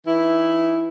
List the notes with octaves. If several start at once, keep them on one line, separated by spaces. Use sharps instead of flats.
E3 D#4 E4